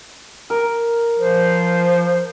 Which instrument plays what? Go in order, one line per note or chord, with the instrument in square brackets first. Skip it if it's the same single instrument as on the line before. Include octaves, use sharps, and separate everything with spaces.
[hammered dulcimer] A#4
[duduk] F3 [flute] C5